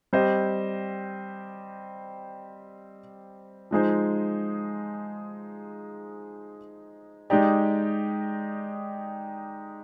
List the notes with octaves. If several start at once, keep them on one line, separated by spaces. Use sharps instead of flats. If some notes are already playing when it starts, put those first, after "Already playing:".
G3 C4 G4 C5 D#5
F3 G#3 D#4 G#4 C5
G#3 D#4 G4 D5